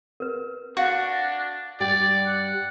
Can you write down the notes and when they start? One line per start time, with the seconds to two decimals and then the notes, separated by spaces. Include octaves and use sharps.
0.20 A#4 B4
0.77 D4 F#4 F5 C#6
1.80 G2 G3 D5 G5
2.26 F#5